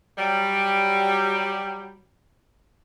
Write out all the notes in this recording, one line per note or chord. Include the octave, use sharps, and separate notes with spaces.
F#3 G3